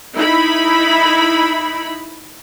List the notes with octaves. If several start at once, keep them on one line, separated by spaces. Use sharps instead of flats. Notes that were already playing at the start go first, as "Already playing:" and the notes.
D#4 E4 B5